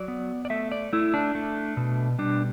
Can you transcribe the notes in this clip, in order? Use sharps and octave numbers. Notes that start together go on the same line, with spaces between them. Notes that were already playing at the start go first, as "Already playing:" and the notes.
Already playing: F#3 D5
B3
D5
A3 E5
D5
A3 E4
D4
A3
B2
G3 D4